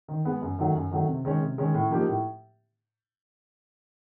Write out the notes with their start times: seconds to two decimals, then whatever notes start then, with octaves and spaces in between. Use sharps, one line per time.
0.08 D#3
0.25 G#3 B3
0.42 F#2
0.59 D#3 F#3 A3
0.75 F#2
0.91 D#3 F#3 A3
1.08 C3
1.25 D#3 G#3 C#4
1.41 C3
1.58 D#3 G#3 C#4
1.74 A2
1.91 F3 A#3 D#4 G4
2.08 A2